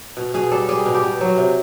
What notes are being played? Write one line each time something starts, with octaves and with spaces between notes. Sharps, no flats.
B2
B2 G#4
G3 A4
G3 G#4
B2
G4
B2
F#3
C3